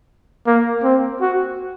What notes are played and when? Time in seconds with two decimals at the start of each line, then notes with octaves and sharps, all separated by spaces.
0.47 A#3
0.83 C4
1.21 F#4